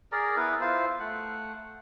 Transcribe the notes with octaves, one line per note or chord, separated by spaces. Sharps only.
G#4 A#4 D5 A#5
B3 E4 A#4 B4
E4 F4 C5
A3 F#5